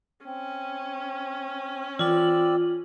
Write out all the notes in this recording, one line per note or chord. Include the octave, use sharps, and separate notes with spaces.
C4 C#4
E3 C4 F4 D5 E6 F#7